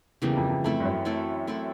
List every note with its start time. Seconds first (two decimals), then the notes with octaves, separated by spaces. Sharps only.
0.22 E2 C#3 E3 G3 A#3
0.37 F2
0.50 F2
0.64 F2 A3 C4 E4 A4
0.80 G2
0.85 F#2
1.05 A3 C4 E4 A4
1.47 A3 C4 E4 A4